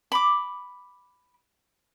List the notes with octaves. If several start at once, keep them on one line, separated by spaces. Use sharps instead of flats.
B5 D6